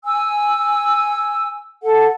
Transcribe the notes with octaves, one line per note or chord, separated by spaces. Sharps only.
G#5 E6
A4 F#5